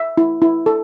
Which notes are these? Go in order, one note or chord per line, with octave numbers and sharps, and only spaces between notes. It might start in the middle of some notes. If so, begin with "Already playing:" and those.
Already playing: E5
E4
E4
A4